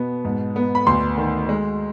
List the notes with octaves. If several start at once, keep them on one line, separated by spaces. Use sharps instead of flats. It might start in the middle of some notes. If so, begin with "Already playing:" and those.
Already playing: B2 B3
G#2
B3
B5
D2 C6
D#3
G#3